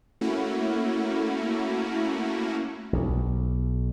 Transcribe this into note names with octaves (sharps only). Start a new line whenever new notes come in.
A3 A#3 C#4 E4 F#4
B1